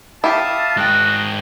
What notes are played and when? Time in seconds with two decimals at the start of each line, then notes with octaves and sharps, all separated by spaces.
0.24 E4 G4 E5 F5 A5 D#6
0.77 G#2 F#4 D#5 G5